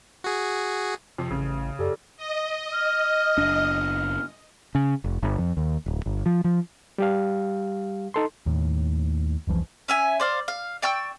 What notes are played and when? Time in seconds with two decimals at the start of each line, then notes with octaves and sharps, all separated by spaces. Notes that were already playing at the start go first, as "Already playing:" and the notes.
0.24 F#4 G#4
1.18 F2 C3
1.31 A1 C#3
1.79 F#2 G4 A4 D5
2.17 D#5
2.72 F6
3.38 F#1 D4
4.75 C#3
5.04 F1
5.23 G1
5.38 F2
5.57 D#2
5.86 D1
6.06 G1
6.26 F3
6.44 F3
6.98 G3 G4 F5
8.14 D#4 A4 C6
8.46 D#2 A2
9.47 F1 C2 E3 F3
9.88 C#4 E5 G#5
10.20 C5 D5 F5
10.48 F5
10.82 D5 G5 C#6 E6